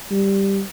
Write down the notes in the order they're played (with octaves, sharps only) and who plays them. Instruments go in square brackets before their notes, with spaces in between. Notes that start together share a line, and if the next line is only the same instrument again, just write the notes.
[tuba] G3